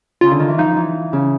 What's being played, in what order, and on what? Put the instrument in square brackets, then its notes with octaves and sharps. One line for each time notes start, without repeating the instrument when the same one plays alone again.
[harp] C#3 [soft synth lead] F4
[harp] D3
D#3
E3
[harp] F3 [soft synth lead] D#4
[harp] E3
C#3